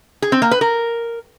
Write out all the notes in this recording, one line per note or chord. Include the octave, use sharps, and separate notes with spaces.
G#4
C4
A#3
B4
A#4